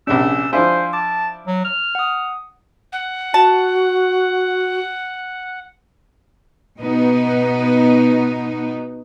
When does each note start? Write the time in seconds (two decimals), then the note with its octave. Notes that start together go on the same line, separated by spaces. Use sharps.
0.07 A#1 C3 C#4 D4 E6
0.53 F3 D4 E4 C5 F5 G#5 C6
0.93 A5 D6
1.47 F#3
1.65 F6
1.95 F#5 D#6
2.92 F#5
3.34 F#4 A5
6.79 B2 B3 D#4